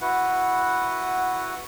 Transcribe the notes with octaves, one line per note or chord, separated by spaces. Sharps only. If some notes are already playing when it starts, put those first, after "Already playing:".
E4 F#4 B4 F#5